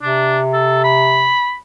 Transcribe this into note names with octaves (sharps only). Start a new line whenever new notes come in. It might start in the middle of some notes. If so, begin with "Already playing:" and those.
C3 D4
A4
B5